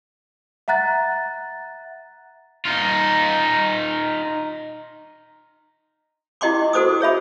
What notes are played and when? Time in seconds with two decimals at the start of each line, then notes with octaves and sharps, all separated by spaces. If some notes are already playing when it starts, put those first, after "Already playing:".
0.68 E5 F#5 A#5 F#6 A6
2.65 D#4 F4
6.41 E4 G4 D#5 G5 C6 D6
6.73 F#4 A4 C5 D6 D#6
7.00 G#4 C#5 E5 B5